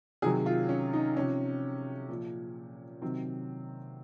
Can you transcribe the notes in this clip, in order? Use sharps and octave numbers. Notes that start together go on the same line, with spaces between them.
C3 D#3 F#3 G#4
F4
C#4
D#4
C3 F3 C#4
A#2 F3
C3 D#3 F#3 C4